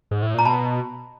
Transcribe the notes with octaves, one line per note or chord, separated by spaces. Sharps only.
G#2
A2
A#2 A#5
B2 A5 B5